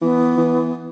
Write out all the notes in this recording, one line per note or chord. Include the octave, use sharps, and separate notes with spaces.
E3 B3
E3